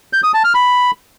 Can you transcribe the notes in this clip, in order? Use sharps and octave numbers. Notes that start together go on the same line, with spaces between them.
G6
D#6
A5
F6
B5